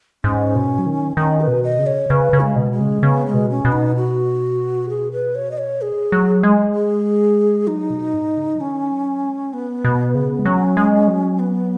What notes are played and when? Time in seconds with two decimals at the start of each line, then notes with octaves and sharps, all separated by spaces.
0.24 G#2 C#4
0.55 B2
0.79 F#3
0.86 D#3
1.17 D#3 C#4
1.41 B4
1.48 B2
1.63 D#5
1.79 C#3
1.87 C#5
2.10 C#3 B4
2.33 C#3
2.41 G#3
2.56 B2
2.72 G#3
2.80 C#3
3.03 C#3 B3
3.26 G#3
3.34 B2
3.50 C#4
3.65 B2
3.72 D#4
3.96 F#4
4.89 G#4
5.12 B4
5.35 C#5
5.51 D#5
5.58 C#5
5.82 G#4
6.12 F#3
6.43 G#3
6.74 G#4
7.67 F#3 D#4
7.90 B2
8.14 G#2
8.37 C#3
8.55 F#3
8.61 D#3 C#4
8.91 F#3
9.22 G#3
9.53 B3
9.84 B2
10.15 C#3
10.39 G#3
10.45 F#3 C#4
10.77 G#3
11.08 F#3
11.39 B3